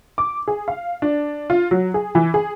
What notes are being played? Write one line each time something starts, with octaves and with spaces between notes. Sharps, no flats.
D6
G#4
F5
D4
F4
F#3
G#4
E3
G#4